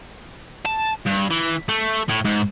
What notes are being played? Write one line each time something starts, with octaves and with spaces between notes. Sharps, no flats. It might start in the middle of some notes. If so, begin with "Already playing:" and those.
A5
G2
E3
A3
A2
G#2